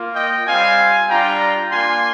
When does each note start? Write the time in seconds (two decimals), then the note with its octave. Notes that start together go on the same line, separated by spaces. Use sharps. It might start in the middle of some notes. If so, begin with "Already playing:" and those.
Already playing: A#3 F4
0.15 D#5 G5
0.47 G3 C4 F4 F5 G#5
1.09 G3 D4 F4 G5 A#5
1.71 A#3 D4 F4 G#5 C6